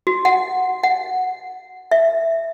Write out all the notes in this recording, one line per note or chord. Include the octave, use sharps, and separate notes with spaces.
F#4
F#5
F#5
E5